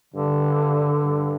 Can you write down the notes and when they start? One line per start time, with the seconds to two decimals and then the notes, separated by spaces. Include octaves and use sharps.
0.14 G2 D3
1.03 G2